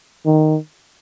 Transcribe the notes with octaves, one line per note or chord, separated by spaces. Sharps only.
D#3